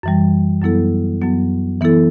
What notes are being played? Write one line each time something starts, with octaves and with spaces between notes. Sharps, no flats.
F#2 E3 G3
F#2 F#3 B3 E4 A4
F#2 F#3 B3
E3 B3 E4 A4